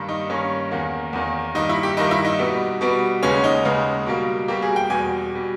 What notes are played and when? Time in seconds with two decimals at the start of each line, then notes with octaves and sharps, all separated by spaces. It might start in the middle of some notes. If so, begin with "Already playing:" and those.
Already playing: G2 D#3 A#3
0.09 D#4
0.30 G2 D#3 A#3 C#4
0.71 E2 D#3 A#3
1.13 E2 D#3 A#3
1.55 G2 D#3 A#3 D#4
1.69 E4
1.83 G4
1.97 G2 D#3 A#3 D#4
2.11 E4
2.25 D#4
2.39 B2 G3 B3
2.81 B2 G3 B3
3.23 D#2 C#3 G#3 B3 C#4
3.44 D#4
3.64 D#2 C#3 G#3 B3
4.07 B2 G3 A#3
4.48 B2 G3 A#3 G4
4.62 G#4
4.76 G5
4.90 E2 B2 G3 G#5
5.34 B2 G3